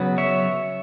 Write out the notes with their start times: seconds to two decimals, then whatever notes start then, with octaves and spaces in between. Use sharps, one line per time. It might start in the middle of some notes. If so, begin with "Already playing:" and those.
Already playing: C#3 F#3 B3
0.18 C#5 E5